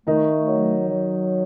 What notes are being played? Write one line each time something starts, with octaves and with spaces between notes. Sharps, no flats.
D#3 A3 D#4
F#3
F#3